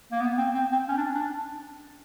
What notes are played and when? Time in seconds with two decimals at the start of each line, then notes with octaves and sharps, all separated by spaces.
0.12 A#3
0.21 B3
0.38 C4
0.54 C4
0.72 C4
0.89 C#4
0.97 D4
1.15 D4